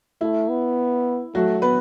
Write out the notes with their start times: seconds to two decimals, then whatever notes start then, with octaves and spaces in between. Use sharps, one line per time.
0.21 A3 E4
0.49 B3
1.35 F#3 A3 F#4
1.62 B3 B4